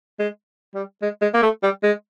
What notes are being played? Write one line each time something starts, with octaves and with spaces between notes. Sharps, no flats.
G#3
G3
G#3
G#3
A#3
A3
G3
G#3